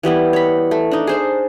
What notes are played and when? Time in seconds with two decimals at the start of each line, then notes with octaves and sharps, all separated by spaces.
0.03 E3 G3 B3 E4
0.33 C#5 B5
0.71 A3
0.91 D4 D#4
1.07 G#4 C5 A5